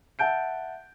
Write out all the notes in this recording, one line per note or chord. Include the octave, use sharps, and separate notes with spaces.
E5 F#5 A5 G6 D7